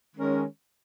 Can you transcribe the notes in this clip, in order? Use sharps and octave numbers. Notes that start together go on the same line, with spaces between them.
D#3 G#3 C#4 A#4